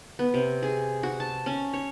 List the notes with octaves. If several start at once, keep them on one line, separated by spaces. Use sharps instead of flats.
B3
C3
G#4
F#4
A5
C#4
C#5